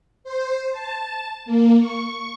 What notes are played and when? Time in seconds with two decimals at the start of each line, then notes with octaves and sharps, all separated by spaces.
0.24 C5
0.72 A5
1.46 A#3
1.79 C#6